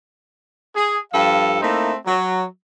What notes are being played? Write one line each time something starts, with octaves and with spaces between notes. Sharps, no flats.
G#4
G2 F3 A4 F5
A3 A#3 C4 D#4 E4
F#3